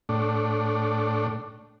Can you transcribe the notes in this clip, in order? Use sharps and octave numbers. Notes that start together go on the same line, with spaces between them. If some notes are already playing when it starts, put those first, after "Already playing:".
A2 D4